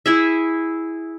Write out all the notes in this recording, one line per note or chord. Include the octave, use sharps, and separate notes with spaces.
E4 G#4 E5